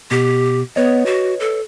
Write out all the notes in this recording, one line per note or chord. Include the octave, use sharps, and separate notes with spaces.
B2 G4
B3 B4 C#5 D#5
F#4
A4